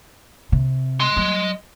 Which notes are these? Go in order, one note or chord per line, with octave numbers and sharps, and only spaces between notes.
C3
D#5 C6
F#3